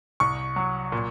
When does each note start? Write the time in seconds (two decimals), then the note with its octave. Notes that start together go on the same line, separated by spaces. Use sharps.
0.20 C2 C#6
0.56 F#3
0.92 A#2